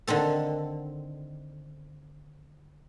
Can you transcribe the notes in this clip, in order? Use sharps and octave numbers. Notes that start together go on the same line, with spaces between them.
D3 D#3 C4 A4